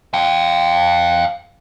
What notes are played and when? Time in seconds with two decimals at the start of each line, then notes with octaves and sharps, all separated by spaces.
0.14 F5 G5